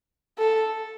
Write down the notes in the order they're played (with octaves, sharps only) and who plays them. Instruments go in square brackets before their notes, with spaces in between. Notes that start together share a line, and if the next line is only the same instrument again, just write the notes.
[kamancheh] A4